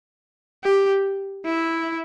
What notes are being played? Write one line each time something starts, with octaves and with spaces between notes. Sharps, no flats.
G4
E4